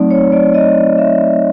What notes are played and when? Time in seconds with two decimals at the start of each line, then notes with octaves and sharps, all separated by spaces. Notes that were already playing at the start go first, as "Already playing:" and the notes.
Already playing: F#3 A3 C4 D#4 D5
0.11 C#5
0.32 D5
0.54 D#5
0.98 E5